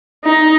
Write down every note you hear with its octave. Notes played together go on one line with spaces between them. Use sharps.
D#4